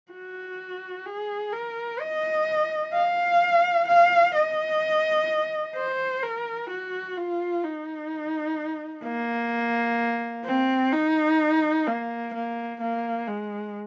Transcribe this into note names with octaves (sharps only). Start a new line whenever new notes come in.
F#4
G#4
A#4
D#5
F5
F5
D#5
C5
A#4
F#4
F4
D#4
A#3
C4
D#4
A#3
A#3
A#3
G#3